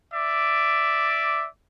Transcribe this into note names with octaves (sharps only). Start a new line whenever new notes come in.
D5 E5 D6